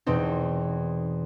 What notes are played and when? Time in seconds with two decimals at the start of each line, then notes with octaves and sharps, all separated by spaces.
0.06 E2 B2 C4 D#4